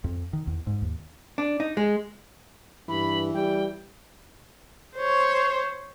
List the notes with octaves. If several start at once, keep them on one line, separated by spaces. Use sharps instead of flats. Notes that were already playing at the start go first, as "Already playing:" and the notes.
F2
D#3
E2
G#2
D#2
D4
D#4
G#3
G2 E3 B5
G3 G5
C5 C#5